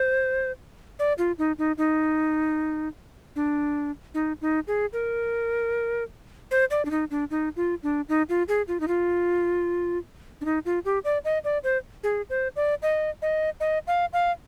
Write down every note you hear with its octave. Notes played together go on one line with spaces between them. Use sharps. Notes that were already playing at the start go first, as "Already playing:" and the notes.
Already playing: C5
D5
F4
D#4
D#4
D#4
D4
D#4
D#4
G#4
A#4
C5
D5
D4
D#4
D4
D#4
F4
D4
D#4
F4
G#4
F4
D#4
F4
D4
D#4
F4
G4
D5
D#5
D5
C5
G#4
C5
D5
D#5
D#5
D#5
F5
F5